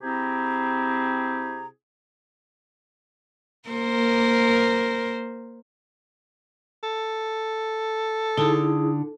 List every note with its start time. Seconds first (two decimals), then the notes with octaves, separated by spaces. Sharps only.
0.02 C3 C4 E4 G4 G#4 A#5
3.69 A#3 A#4 C5
6.83 A4
8.37 D3 D#4 E4 G#4